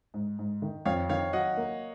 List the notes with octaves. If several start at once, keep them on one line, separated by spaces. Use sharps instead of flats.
G#2
G#2
D#3
F2 C#5 F5
D#3 C#5 F5
F#3 D#5 F#5
A#3